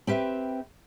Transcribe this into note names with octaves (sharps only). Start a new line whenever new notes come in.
C4 G4 B4 E5